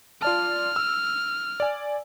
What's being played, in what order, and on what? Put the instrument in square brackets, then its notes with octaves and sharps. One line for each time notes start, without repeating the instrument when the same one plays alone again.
[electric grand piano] F4 D5 A5 [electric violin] F6
[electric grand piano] E6
D5 G#5